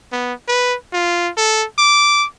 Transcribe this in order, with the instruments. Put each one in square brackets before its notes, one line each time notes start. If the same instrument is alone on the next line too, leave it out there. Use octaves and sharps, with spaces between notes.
[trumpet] B3
B4
F4
A4
D6